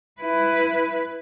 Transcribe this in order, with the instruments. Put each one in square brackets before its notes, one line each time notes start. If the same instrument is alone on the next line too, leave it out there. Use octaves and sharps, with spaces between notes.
[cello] E4 B4